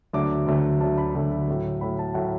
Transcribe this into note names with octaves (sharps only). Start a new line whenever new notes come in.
D2 D3 F#3 A3 D6
D2 D3 F#3 A3
D2 D3 F#3 A3 A5
B5
D2 D3 F#3 A3
A2 F#3 A3
A2 F#3 A3 B5
A5
A2 F#3 A3 F#5